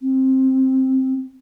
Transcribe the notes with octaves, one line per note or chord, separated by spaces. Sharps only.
C4